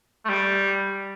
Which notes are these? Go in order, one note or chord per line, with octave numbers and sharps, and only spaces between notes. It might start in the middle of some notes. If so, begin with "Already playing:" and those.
A3
G3